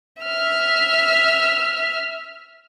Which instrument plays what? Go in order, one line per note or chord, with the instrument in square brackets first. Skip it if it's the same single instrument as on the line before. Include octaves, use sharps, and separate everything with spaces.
[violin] E5 F6